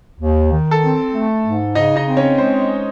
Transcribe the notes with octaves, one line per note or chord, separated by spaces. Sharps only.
D#2
D#3
A4 A5
C4
A3
G#2
C#3 D#4 D#5
D#4 D#5
C4
C#4 C#5
G#3 C5